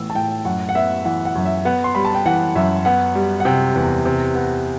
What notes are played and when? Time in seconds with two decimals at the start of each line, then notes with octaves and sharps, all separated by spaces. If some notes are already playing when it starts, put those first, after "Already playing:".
Already playing: A2 E3 B3 E6
0.10 A5
0.15 A2 G5
0.45 F#2 F#5
0.69 F#5
0.75 B3 E5
1.05 E3 F#5
1.25 F#5
1.36 F#2
1.45 E5
1.65 B3 F#5
1.84 C6
1.95 G3 B5
2.05 A5
2.15 G5
2.26 E3 F#5
2.56 F#2 E5
2.85 B3 F#5
3.15 G3
3.40 F#5
3.45 C3 G5
3.75 E2
4.05 C3
4.35 B3